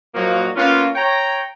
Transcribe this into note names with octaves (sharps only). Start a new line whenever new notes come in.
A#2 F3 F#3 A#3 D#4 F#4
A#3 B3 C#4 F4
C#5 G5 A#5